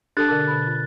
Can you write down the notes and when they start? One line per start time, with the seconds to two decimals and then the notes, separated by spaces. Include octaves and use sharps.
0.17 D4 G4 A4 A5 F#6 A6
0.28 B2 D3 A#4 A5 D6
0.47 B2 B5
0.67 F4